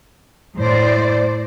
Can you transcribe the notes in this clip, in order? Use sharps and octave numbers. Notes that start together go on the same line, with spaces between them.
A2 C5 D5